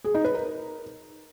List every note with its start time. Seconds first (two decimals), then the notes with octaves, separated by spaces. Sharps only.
0.04 G#4
0.14 D#4
0.25 B4
0.35 A#4